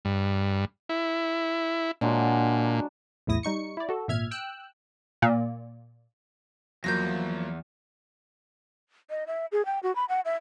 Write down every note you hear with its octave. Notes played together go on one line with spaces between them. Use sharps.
G2
E4
A#2 F#3 G#3 D4
B1 E2 A2 E4 D#6 A#6
G3 D#4 C#6 C#7
E4 D5
F#4 A4
G#1 A#2 E5 F6 G#6
G5 E6 F#6
A#2
E2 F3 F#3 A#3 G6 A#6
D#5
E5
G#4
G5
F#4
B5
F#5
E5